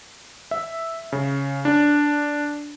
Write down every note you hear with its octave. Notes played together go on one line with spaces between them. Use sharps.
E5
C#3
D4